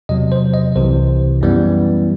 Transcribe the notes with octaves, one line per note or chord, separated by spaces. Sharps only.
E2 C3 F#3 D#5
C5
D#5
C2 C3 E3 C5
F#2 E3 G3 B3